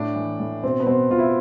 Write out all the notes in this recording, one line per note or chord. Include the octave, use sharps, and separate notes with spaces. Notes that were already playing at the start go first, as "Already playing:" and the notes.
Already playing: A2 D4
E3
A2
B2 C4
B3
B2 C4
B2 F4
E4